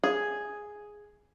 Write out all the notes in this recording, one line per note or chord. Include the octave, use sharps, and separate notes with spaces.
G#4